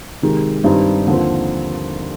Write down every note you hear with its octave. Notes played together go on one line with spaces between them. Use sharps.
C3 D#3 G#3
G2 D#3 G3 C4 D#4
D#2 D3 F3 C4